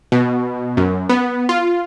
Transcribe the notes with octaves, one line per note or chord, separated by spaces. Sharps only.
B2
F#2
B3
F4